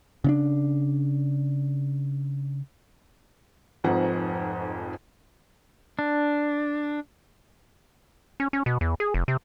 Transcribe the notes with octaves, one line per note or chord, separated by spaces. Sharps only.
C#3 C#4 D4
F1 F2 G#2 F3 C4 F#5
D4
C#4
C#4
B2
E2
G#4
F1
C3